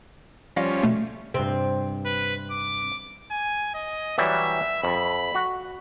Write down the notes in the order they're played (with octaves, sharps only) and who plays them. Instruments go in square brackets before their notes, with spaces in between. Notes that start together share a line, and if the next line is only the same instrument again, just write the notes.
[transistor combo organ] F3 G3 C#4 [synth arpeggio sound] D5 F5 A#6
[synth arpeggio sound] B2 A3
[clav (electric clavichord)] G2 C3 [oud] C4
[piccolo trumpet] B4
D6
G#5
D#5
[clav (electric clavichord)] E3 F#3 G3 [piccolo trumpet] E5
[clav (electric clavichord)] F2 [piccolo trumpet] B5
[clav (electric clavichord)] F#4 F#5